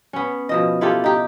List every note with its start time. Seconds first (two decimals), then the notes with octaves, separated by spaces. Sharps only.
0.13 B3 C#4
0.49 B2 F3 D#5
0.81 E4 F4 G4 A4
1.04 D#4 G4